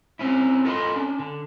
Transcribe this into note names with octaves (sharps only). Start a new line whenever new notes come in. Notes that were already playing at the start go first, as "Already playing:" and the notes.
C4 C#4 E4
F4 A4 A#4 D#5 B5 C6
C#4 D4
D3